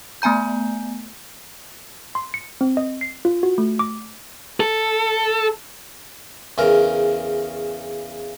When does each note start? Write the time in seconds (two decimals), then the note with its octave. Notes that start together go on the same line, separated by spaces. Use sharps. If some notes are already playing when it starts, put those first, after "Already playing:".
0.22 A3 B3 G#5 A#5 G6
2.15 C6
2.34 C#7
2.61 C4
2.77 D#5
3.01 C7
3.25 F4
3.43 F#4
3.58 A3
3.79 D6
4.60 A4
6.58 E2 C#3 A#4